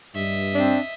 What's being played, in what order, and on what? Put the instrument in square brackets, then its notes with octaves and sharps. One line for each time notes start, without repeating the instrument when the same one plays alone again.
[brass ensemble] G2 [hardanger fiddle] D#5 E5
[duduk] C4 [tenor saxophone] D4